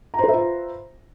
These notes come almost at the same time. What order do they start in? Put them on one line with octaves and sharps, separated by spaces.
A#5 C5 B4 E5 F4